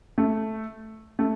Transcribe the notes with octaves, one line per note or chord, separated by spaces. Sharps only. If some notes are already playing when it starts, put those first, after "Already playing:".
A3
A3